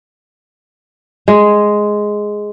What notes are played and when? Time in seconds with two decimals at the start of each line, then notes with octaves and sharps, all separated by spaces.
1.28 G#3